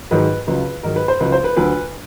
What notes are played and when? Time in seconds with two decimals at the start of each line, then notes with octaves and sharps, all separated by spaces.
0.11 G#2 D#3 F#3 B4
0.47 C#2 C#3 F#3 B4
0.83 G#2 D#3 F#3 A#4
0.96 B4
1.08 C5
1.20 C#2 C#3 F#3 B4
1.32 C5
1.44 B4
1.56 D2 D3 F#3 B4